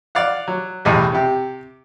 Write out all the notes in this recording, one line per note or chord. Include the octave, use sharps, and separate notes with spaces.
D5 F5 F#5
F#3
B1 E2 A2 G3
C3 G4